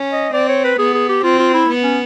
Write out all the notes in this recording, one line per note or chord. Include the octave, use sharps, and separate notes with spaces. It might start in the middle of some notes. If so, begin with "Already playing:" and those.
Already playing: C#4
D#5
C4 D5
C#5
B4
B3 G#4
G#4
G4
C4 F4
F4
E4
B3
C#4